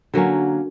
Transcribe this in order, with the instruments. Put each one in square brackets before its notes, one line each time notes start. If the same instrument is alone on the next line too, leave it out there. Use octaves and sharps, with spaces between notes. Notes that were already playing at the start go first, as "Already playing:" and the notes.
[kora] D3 F#3 A#3 C#4